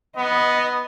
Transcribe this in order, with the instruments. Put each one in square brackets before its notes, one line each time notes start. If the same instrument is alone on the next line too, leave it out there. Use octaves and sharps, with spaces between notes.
[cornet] B3 [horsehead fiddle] D#5